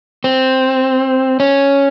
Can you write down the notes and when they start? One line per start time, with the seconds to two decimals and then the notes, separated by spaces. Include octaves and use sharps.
0.24 C4
1.40 C#4